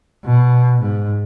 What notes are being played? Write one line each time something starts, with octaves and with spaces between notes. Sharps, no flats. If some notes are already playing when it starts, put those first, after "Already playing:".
B2
G#2